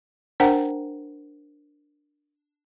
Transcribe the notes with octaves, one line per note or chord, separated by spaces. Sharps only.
D4 A#4 C5 F#5 G5 A#5